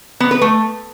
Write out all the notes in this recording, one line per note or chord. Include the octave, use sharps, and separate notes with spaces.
B3
B4
A3